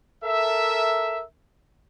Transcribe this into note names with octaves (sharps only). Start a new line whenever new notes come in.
A4 A#4 E5